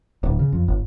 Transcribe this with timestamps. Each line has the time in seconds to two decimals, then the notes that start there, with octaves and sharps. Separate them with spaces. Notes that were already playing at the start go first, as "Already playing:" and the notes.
0.23 D1
0.39 C#3
0.53 F2
0.68 G1